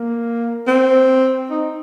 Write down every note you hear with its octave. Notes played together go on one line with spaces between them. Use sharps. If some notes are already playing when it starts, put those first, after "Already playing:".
Already playing: A#3
C4
D#4